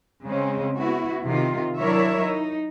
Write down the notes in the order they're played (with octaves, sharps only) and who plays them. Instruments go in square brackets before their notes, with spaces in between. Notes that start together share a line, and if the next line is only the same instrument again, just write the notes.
[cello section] C#3 G#3 C4 C#4
B3 E4 F#4
C3 D#3 F4
F#3 D4 E4 A#4 C#5 E5
D#4